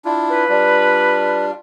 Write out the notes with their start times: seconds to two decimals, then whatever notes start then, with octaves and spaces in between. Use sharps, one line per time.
0.05 D4 E4 F4
0.29 B4
0.49 G3 D4 F4